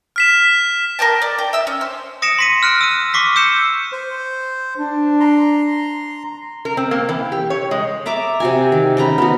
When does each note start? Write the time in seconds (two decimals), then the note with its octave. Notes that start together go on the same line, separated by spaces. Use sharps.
0.16 F6 B6 E7
0.99 A#4 C#5 G5 A5
1.22 D5
1.39 G5
1.53 E5 E6
1.67 C#4
1.81 C5
2.22 D#6 A#6 C#7 D7 E7
2.38 C6 B6 D#7
2.63 F6 F#6 D7
2.81 E6 D#7
3.13 C#6 D6 B6 C7
3.36 E6 G6 C#7 E7
3.92 C5
4.78 D4
5.20 A#5 C6
6.65 A#4
6.77 C4
6.91 A#3
7.09 E3
7.32 G4
7.50 C#5
7.71 G#3
8.06 D5 E5 A#5 D6
8.40 C3 F#4 G#5
8.72 D#3
8.97 C#3 D#4 A#5 B5
9.18 B3 F#4